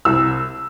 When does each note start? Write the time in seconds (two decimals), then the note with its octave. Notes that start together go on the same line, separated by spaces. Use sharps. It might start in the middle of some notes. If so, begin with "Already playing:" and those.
0.05 C2 E6